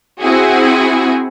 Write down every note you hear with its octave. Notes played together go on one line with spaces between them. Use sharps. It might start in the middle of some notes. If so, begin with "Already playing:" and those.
C4 E4 F#4 G#4